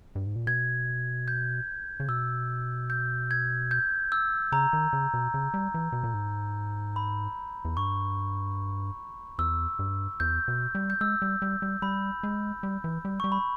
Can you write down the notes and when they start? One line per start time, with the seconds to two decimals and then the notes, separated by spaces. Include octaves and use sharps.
0.15 G2
0.26 G#2
0.36 A#2
0.47 B2 G#6
1.28 G6
2.00 C#3
2.09 B2 E6
2.90 G6
3.31 G#6
3.71 G6
4.12 E6
4.52 C#3 A#5
4.73 D#3
4.93 C#3
5.14 B2
5.34 C#3
5.54 G3
5.74 E3
5.92 B2
6.04 A#2
6.14 G#2
6.96 B5
7.65 E2
7.77 G2 C#6
9.39 E2 E6
9.79 G2
10.20 E2 G6
10.48 B2
10.75 G3
10.90 G6
11.01 G#3 E6
11.22 G3
11.42 G3
11.62 G3
11.82 G3 B5
12.23 G#3
12.63 G3
12.84 E3
13.05 G3
13.20 G3 C#6
13.32 B5